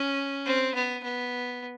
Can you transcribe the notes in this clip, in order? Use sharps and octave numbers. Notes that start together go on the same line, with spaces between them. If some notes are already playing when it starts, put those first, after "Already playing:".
Already playing: C#4
C4
B3
B3